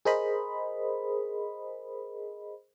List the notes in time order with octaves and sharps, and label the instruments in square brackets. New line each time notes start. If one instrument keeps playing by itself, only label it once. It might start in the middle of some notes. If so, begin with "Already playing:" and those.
[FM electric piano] G#4 A#4 C5 D#5 B5